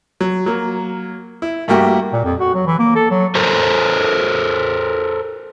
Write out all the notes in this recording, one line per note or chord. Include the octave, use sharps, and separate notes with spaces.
F#3
F#3 A#3
E4
G2 A3 A#3 F#4 G4
A#2
F2
F#4
F#3
E3
A#3
A4
F#3
A4 A#4 C5